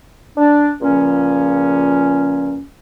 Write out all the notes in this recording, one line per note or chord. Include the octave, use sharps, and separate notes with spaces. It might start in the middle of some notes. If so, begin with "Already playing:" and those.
D4
C#2 A#2 C#3 F3 C#4